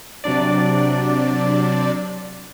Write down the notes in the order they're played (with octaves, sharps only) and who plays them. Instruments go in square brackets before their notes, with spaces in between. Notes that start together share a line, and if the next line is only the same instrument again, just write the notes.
[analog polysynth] C3 F#3 D4 D5